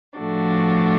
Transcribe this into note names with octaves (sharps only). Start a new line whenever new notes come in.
A2 F3 A3 D4 F#4